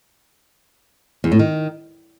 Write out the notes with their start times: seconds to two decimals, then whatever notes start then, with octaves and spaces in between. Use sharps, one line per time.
1.24 E2
1.32 A2
1.39 D#3